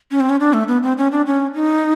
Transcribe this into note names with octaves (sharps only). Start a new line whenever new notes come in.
C#4
C4
C#4
D4
A3
B3
C4
C#4
D4
C#4
D#4